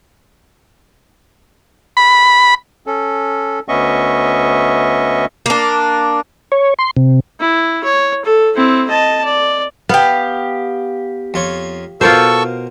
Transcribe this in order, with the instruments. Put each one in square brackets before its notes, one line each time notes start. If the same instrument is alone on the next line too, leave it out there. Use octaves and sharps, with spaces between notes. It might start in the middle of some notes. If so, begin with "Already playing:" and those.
[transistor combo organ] B5
[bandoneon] C#4 A4
D2 B3 C#4 D#5 E5 C#6
[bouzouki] A#3 D4
[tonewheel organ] C#5
C6
C3
[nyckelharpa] E4
C#5
A4
C4 E4
D#5 A5
D5
[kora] B3 [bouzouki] G4 F5
[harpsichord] F2 F4 C#5
[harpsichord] B2 A#4 D6 [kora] F4 C5 [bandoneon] A4 C#6 E6